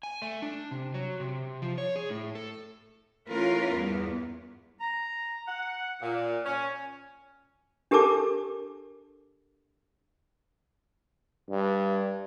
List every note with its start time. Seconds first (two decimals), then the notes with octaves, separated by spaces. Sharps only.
0.03 G#5
0.22 A3
0.42 D4
0.71 C3
0.94 F#3
1.20 C3
1.62 F3
1.78 C#5
1.96 G#4
2.10 A2
2.35 A4
3.28 E3 A3 C#4 F4 A#4 B4
3.74 E2 G2 B3
4.81 A#5
5.48 F#5
6.02 A#2
6.45 C#4
7.91 D4 G4 A4 A#4 A5 D6
11.50 G2